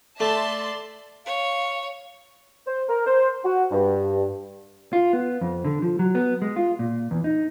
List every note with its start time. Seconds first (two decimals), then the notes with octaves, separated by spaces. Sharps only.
0.20 A3 A4 D5 E5 A5 C6
1.26 C#5 F5
2.67 C5
2.89 A#4
3.07 C5
3.45 F#4
3.71 G2
4.93 F4
5.13 B3
5.41 F2
5.65 D3
5.82 F3
5.99 F#3
6.15 B3
6.42 G#3
6.56 F4
6.79 A#2
7.11 E2
7.24 D#4